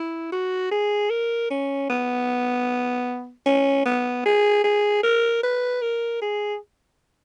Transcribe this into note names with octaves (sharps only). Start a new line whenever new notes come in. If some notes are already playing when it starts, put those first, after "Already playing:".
Already playing: E4
F#4
G#4
A#4
C#4
B3
C#4
B3
G#4
G#4
A#4
B4
A#4
G#4